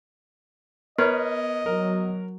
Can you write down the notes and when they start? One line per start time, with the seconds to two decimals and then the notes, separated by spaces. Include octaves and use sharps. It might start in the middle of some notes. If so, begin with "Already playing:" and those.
0.98 B3 A#4 B4 C#5 D#5
1.66 F#3 A#4